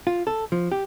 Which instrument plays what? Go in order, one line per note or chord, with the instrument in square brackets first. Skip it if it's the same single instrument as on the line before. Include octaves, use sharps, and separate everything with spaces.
[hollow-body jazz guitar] F4
A4
F3
G4